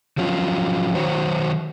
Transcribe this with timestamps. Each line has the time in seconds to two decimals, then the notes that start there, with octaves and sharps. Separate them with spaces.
0.18 F3 F#3 C#4 F4
0.95 D#3 F#3 F#4 C5 C#5